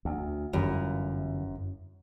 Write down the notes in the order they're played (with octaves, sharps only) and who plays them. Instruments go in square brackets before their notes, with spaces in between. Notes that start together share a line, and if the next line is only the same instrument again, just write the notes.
[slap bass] D2
[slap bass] G1 E3 [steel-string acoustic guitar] F#2